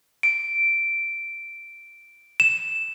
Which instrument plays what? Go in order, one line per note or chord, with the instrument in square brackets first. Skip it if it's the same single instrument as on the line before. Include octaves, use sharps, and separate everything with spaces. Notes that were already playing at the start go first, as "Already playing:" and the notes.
[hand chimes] D7
[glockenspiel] E7